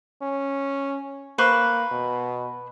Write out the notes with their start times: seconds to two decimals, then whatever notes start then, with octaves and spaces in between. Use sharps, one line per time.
0.22 C#4
1.38 A#3 B4 C5 C#6
1.91 B2